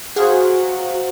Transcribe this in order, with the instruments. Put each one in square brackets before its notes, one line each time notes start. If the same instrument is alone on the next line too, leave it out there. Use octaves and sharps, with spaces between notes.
[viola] F#3 F#4 [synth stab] G#4 [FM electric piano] C5 F5 F#5